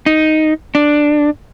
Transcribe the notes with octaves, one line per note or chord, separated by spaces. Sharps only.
D#4
D4